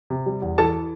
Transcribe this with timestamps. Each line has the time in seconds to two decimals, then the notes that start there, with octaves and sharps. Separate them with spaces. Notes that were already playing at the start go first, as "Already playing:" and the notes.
0.10 C3
0.26 G3
0.42 E2
0.58 E3 A4 A5